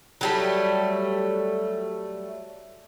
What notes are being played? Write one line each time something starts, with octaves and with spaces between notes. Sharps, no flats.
F#3 G3 A3